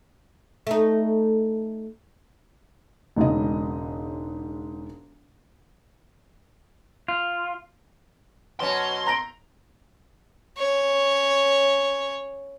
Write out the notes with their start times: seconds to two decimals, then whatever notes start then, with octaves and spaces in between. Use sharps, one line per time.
0.67 A3 D#4
3.16 E1 G#2 C#3 D#5
7.08 F4
8.60 B2 F#3 C#4 C6
9.07 A#5 A#6 D7
10.58 C#4 C#5